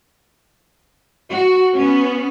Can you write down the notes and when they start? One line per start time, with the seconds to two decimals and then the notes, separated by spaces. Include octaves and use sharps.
1.29 F#4
1.74 B3 C#4